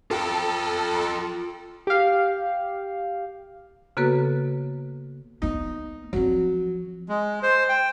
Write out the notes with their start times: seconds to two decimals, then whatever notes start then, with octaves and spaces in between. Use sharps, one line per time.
0.11 F4 A4 G5
1.87 G4 F5
3.97 C#3 A#3 B3 F#4 A4 B4
5.42 A#3 B3 D#4
6.13 F3 F#3 C4
7.09 G#3
7.43 C5
7.69 G5